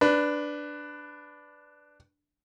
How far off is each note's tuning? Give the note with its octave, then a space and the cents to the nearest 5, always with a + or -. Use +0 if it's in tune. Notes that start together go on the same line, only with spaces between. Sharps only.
D4 +0 B4 +10